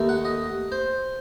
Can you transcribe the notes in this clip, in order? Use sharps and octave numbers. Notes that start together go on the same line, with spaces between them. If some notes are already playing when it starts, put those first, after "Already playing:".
Already playing: D#2 D#3 A3 D#4
F#5
D#5
C5